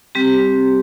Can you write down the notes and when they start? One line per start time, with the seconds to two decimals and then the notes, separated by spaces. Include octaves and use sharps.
0.15 G3 C4 G4